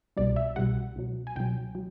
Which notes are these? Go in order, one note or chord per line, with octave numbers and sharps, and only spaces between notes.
C2 B2 G3 D5
E5
C2 B2 G3 F#5
C#2 B2 F#3
G#5
C#2 B2 F#3 G5
F#3